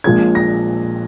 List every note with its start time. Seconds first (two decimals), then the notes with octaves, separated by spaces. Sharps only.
0.04 A#1 A#2 F3 G#3 G#6
0.35 A#6